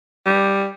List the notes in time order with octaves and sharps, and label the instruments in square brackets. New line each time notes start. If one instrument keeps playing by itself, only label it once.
[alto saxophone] G3